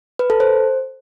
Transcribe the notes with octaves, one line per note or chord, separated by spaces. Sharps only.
B4
A4
C5